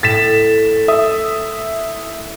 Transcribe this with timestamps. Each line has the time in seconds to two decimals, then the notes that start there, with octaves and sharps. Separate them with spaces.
0.03 A2 A6 B6 E7
0.88 E5 D#6